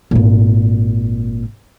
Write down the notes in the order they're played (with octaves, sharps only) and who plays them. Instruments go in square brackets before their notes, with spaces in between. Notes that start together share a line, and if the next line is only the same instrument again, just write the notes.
[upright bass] G#1 A#2